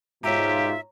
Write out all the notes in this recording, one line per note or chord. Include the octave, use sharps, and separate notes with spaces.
G#2 B2 F4 G4 C#5 E5 A#5